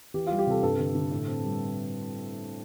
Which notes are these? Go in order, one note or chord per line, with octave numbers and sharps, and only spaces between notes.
E3 G4
G3 F4
G4
C3 A4
G2 A4
D3
D3
A2
C4
G3